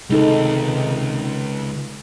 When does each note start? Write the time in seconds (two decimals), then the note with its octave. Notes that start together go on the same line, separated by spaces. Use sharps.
0.10 C#2 C3 D#3 G#3 D#4 A4